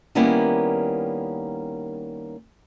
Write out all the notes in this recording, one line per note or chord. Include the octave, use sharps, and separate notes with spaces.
D#3 G3 A#3 B3 C#4 E4